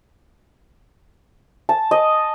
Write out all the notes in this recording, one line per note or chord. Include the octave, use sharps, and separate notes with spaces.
A5
D#5